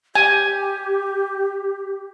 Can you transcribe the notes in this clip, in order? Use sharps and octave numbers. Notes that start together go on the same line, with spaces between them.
G4 G#5